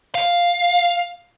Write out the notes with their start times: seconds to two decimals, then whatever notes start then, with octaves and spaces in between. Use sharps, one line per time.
0.15 F5